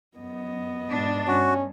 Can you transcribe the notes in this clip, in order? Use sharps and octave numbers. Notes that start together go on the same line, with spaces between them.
F#2 B3 D#5
G#2 B2 D4
G2 C#4 F#4